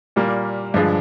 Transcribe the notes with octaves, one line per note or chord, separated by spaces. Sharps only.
A#2 G3 A#3
G2 D3 F3 G#3